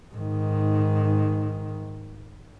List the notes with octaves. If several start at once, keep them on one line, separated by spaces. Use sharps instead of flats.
G#2 D#3